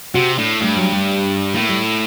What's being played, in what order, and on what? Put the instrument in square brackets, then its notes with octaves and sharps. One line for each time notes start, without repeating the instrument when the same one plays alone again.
[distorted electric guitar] C3 [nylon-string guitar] F#4
[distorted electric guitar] A2 [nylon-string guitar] D4
[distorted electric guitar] G2 [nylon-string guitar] A3
[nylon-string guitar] F#3
G3
[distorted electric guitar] A2 [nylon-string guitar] A#3
[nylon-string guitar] G3